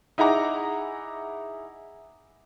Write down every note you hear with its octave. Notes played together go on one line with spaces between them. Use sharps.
D#4 E4 G#4 F#5 A#5 D6